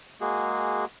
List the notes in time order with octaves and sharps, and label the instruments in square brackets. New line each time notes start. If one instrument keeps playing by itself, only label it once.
[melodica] G#3 A#3 F#4 G#4